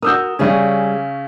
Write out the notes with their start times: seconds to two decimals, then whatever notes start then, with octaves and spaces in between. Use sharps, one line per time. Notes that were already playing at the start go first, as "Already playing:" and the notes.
0.02 F#4 A#4 D#6 E6 G6
0.39 C#3 G3 C#4 G#4 D5